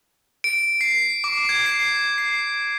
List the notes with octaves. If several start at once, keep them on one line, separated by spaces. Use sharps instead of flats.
D7
C7
D6
G#6
C7
C7